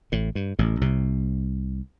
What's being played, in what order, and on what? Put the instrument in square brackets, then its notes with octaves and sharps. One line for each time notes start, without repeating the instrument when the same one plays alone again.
[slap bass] A1 A2
G2
A1 A2
C2 C3